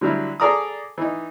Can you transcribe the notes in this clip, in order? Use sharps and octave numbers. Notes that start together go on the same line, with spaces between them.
D3 F#3 G3 E4
G#4 A4 D5 A#5 D6 D#6
E3 D#4